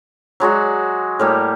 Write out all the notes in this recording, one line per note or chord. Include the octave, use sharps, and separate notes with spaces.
F#3 G#3 F#4 D5
A2 G3 A#3